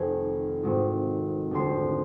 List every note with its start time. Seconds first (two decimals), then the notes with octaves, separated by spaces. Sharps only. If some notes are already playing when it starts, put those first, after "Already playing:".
Already playing: F1 F2 D#3 G#5
0.63 G#1 G#2 D#3
1.51 F1 D#2 D3 F3 C6